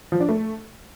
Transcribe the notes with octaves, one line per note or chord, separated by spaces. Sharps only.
F3
D4
A3